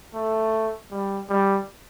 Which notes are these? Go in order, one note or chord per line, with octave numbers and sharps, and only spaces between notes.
A3
G3
G3